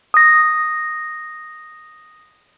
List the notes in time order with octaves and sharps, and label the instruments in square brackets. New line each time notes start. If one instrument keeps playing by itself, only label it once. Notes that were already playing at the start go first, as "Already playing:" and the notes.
[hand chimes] D#6 A#6